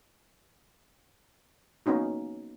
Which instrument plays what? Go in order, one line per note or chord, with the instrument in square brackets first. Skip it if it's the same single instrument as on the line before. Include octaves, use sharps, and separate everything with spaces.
[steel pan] A#3 B3 C#4 D#4 F#4